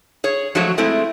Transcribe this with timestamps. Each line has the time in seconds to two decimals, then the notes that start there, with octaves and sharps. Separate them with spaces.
0.24 G#4 C#5
0.55 F3 F#3 G#3 A3 F#4 C#5
0.78 G#3 A3 C4 E4